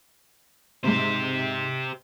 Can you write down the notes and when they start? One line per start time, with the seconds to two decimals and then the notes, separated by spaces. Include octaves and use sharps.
0.84 G#2 C3 G4 C5